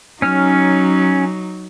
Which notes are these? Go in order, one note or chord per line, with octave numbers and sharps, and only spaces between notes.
F#3 C#4 D#4 F6